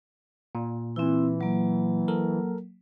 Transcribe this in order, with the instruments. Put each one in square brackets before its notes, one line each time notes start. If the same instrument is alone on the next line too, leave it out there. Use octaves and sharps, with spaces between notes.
[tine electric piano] A#2
[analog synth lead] E3 [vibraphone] C4 E4
[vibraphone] F#3 A#3
[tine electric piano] A4 A#4